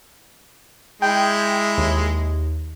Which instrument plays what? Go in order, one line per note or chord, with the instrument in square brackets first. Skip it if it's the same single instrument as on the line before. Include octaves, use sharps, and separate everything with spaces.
[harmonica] G#3 E4 [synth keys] G5
[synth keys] D#2